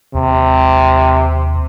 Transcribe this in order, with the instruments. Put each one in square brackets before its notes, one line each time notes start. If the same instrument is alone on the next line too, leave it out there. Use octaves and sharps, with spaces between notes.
[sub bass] D#2 [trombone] C3